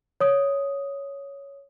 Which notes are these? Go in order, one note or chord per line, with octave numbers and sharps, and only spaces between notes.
C#5 D#6